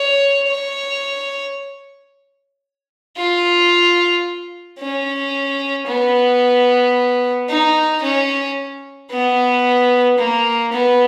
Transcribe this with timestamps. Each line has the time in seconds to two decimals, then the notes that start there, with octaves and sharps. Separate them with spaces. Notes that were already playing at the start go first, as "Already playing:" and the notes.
Already playing: C#5
0.48 C#5
3.17 F4
4.79 C#4
5.87 B3
7.49 D#4
8.02 C#4
9.11 B3
10.18 A#3
10.72 B3